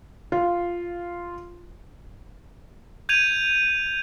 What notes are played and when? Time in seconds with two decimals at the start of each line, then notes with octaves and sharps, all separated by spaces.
0.32 F4
3.09 G6 G#6 D#7 F7